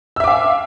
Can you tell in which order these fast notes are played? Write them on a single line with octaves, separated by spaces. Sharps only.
E6 E5 D6 F5